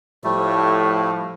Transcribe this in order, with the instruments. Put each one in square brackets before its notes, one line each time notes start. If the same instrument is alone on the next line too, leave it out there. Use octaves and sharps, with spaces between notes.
[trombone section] A2 F3 [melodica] G3 A3